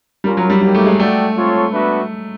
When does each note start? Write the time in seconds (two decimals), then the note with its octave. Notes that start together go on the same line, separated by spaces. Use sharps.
0.24 G3 C#4 F4 A#4
0.37 F#3
0.50 G3
0.61 G3 A#3 D#4 G4 A#4
0.74 A3
0.86 G#3
0.98 A3 F#4 A4 D5 G5
1.36 C4 F4 A4 C#5
1.72 B3 D4 F#4 B4 E5